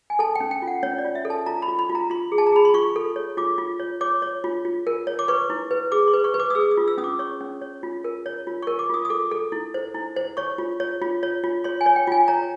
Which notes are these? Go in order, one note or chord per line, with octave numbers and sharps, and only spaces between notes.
G#5
A4 A5
C#4 G5
G5
F4
F#5
C#4 C#5
D5
F4
E5
A4
A5
F4 A#5
B5
F4
B5
F4
A#5
F4 C6
G#4
A5
A#5
G#4 B5
C6
F4 C#6
A4
C#5
F4 D6
F4
C#5
C#5 D6
C#5
F4
F4
A#4
C#5
D6
B4 C#6
E4
B4
G#4 D6
C6
B4
C#6
B4
D6
D#6
G#4 E6
D#6
F4
E6
C#4 D#6
D6
C#5 C#6
C#4
C#5
F4
A#4
C#5
F4
A#4 C#6
D6
F4 D#6
D#6
A4 D6
A4
E4
C5
E4
C5
C#5 C#6
F4
C#5
F4
C#5
F4
C#5 C6
G#5
C#5
G5
F4 G#5
C#5 A#5